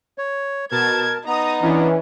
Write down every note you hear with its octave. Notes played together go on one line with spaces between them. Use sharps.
C#5
B2 A#4 A5 G#6
B3 D#4 A#5 D#6
E3 C#4 D4